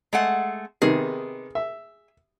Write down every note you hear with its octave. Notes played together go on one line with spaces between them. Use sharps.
G#3 A3 F#5
C3 D#3 B3 G#4
E5